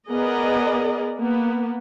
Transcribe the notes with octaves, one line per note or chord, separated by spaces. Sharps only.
B3 G#4 A#4 D5 D#5
A#3 B3